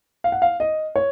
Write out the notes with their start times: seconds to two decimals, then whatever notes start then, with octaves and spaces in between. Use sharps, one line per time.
0.24 F5
0.32 F#5
0.42 F5
0.60 D#5
0.96 C#5